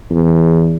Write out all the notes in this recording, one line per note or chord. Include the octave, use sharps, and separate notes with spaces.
E2